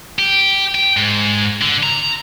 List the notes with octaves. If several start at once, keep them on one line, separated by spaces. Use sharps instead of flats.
G4
G5
G#2
D3
A#5